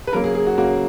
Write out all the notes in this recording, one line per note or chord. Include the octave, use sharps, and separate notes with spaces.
B4
C#3 F#3 A#3 A#4
G#4
G#4
F#4
C#3 F#3 A#3 F#4